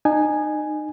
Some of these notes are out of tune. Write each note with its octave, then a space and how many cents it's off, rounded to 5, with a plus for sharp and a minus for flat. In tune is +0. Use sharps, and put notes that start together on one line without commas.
D#4 -30 G#5 +0